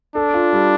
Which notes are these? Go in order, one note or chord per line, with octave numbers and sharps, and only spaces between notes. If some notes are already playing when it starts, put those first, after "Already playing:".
D4 A4
F4
G3